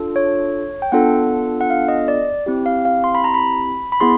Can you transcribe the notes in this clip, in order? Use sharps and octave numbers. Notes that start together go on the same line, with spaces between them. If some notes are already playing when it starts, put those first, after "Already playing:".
Already playing: D4 F4 A4
C#5
G5
B3 D4 F4 A4 F#5
F#5
F5
D#5
D5
C4 E4 G4
F5
F5
C6
B5
A#5
B5
B5
B3 E4 G#4 C6